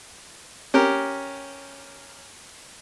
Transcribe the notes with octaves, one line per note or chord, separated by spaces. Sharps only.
C#4 G4 A#4